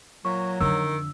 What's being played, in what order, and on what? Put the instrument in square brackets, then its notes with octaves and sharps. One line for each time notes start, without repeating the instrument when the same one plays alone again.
[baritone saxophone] A#2 [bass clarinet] F#3 [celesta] C#6
[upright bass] F2 D3 [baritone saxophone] D#3 [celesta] E6